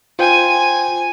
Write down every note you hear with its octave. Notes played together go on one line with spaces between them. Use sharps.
F4 C5 G5 G#5